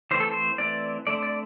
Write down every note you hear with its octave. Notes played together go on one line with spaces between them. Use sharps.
E3 A3 C4 C5
A4
C5
E3 A3 C4 D5
D3 A3 C4 D5
D5